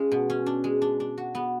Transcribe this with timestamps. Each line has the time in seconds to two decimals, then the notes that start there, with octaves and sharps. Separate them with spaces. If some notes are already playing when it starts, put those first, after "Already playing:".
Already playing: G#3 C#4 F4
0.12 B2
0.30 C#4
0.46 D4
0.64 G#3
0.82 D4
1.00 D4
1.18 F#4
1.35 B3